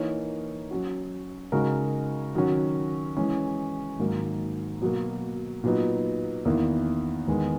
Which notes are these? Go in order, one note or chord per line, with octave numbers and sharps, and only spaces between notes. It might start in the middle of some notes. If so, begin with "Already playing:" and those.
Already playing: E3 A#3 D#4 A#4 C#5
F#3 C#4 F#4
C#3 G#3 D#4 F#4 A#4
D#3 F#3 C#4 F#4
E3 G#3 C#4
G#2 D#3 F#3 A#3
B2 F#3 A#3
A#2 F#3 B3 D#4
E2 D#3 A#3 E4
E2 D#3 G#3 B3